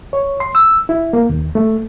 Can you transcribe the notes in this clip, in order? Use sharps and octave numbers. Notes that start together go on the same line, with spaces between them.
C#5
C6
E6
E4
A#3
D#2
A3